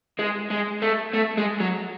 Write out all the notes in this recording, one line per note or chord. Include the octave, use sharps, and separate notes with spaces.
G#3
G#3
A3
A3
G#3
F#3